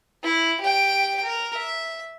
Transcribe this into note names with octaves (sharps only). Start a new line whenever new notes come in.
E4
G4 G5
A#4
E5